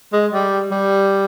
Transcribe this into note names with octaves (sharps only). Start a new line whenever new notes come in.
G#3
G3
G3